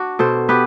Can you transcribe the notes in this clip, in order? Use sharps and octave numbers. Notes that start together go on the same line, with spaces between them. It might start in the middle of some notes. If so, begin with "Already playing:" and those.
Already playing: D4 F#4
B2 A4 C5
B3 G4 B4